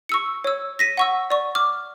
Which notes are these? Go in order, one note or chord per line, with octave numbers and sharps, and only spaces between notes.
C#6 E6 C#7
C#5 E6
A#6 B6 D#7
F#5 C#6 E6
D5 C#6
D6 F6